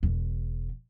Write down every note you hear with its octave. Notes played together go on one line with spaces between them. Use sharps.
E1 E2